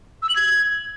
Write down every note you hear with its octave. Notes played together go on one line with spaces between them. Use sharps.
E6
F#7
G#6